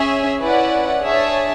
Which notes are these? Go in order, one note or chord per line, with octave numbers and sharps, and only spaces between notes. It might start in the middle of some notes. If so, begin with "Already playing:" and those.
Already playing: C#4 G#4 C#5 E5 G#5
C#4 E4 B4 D5 F#5
D4 G#4 C#5 E5 A5